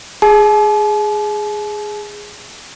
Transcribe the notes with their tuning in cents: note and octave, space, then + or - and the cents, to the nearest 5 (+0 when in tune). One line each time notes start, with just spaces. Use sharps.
G#4 +0 A5 -45